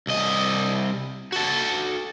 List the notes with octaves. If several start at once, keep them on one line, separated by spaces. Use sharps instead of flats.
C2 D#5
F#4 A4